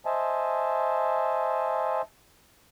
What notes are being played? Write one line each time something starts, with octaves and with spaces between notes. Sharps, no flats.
C5 D#5 E5 G#5 A5